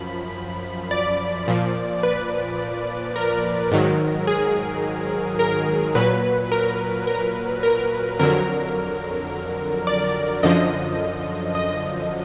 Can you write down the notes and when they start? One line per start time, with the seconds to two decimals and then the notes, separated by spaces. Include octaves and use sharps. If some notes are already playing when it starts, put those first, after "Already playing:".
Already playing: F#2 F3 B5
0.91 D5
1.48 A#2 F3
2.03 B4
3.16 A#4
3.72 G#2 D#3 F#3
4.27 G#4
5.39 A#4
5.95 A#2 F#3 B4
6.52 A#4
7.07 A#4
7.63 A#4
8.19 F2 D3 F#3 A#4
9.87 D5
10.43 F#2 D3 F3 D#5
11.55 D#5